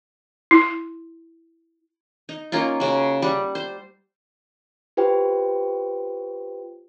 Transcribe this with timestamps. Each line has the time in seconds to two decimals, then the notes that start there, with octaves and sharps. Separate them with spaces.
0.51 E4
2.29 D#4
2.52 A#3 C#4 D#4 F4
2.80 C#3 F#4
3.22 G3 F#5
3.55 C5
4.97 F4 G4 B4 C5 G5